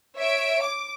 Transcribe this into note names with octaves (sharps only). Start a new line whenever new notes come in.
C#5 E5 D7
D6